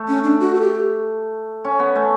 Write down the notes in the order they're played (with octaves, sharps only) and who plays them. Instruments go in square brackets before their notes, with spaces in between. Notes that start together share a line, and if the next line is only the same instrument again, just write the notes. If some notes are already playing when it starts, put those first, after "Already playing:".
Already playing: [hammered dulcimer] A3
[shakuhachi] C#4
D4
F#4
A4
G4
[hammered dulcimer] C#4
B3
A3